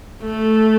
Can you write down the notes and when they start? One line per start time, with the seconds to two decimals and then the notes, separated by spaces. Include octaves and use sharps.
0.22 A3